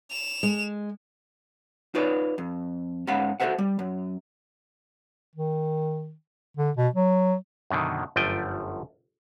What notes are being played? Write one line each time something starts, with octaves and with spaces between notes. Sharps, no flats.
E7 F7
G#3
D#4 F4 B4 C#5 D5
F2
G#2 C#4 F5 F#5 B5
F#4 A4 A#4 C5 E5 F#5
G3
F#2
D#3
D3
B2
F#3
F#2 B2 D3 D#3
G1 F#2 F3 A3 G5 G#5